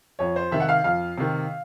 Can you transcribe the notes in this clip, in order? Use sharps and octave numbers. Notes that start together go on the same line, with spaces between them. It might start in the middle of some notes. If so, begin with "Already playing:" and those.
F2 C#5
C5
C3 D#3 E5
F#5
F5
F2 F5
C3 D#3